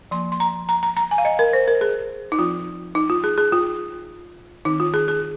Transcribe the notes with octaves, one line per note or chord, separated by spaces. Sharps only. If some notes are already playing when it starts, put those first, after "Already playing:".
F3 A#3 C6
C6
A#5
A#5
A#5
A#5
G#5
F5
D#5
A#4
C5
A#4
G#4
D#4
F3 C4 F4
D#4
F4
G#4
G#4
F4
D#3 C4 D#4
F4
G#4
G#4